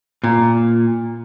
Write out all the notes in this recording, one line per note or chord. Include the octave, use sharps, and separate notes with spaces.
A#2